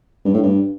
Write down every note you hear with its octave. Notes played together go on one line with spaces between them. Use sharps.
G2
A2
G2